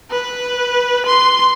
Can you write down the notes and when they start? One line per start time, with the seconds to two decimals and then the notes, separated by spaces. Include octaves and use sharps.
0.11 B4
1.06 C6